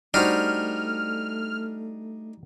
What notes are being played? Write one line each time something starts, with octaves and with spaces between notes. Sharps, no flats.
G3 A3 D4 D#4 F#4 C5 F6